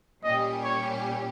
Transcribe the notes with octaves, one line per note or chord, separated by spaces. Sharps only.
A#2 G3 C#4 G4 D#5
C#5